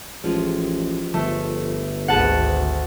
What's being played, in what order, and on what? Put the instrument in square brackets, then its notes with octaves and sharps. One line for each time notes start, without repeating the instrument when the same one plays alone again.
[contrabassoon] A1 [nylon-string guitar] F3 G3 G#3
[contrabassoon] G1 [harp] A3
[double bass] G#1 D2 [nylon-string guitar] D4 G#4 B4 [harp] F#5 A5